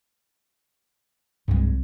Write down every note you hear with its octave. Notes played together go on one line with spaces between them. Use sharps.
C2 G2 F#3 G#3